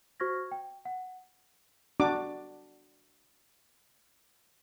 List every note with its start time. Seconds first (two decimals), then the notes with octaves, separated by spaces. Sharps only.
0.20 F#4 C5 C#6 F6 G#6 A#6
0.52 G5
0.85 F#5
2.00 D4 F#4 D6